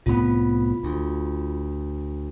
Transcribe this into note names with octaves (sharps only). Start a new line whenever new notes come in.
C2 A2 B3 F4 B5
D2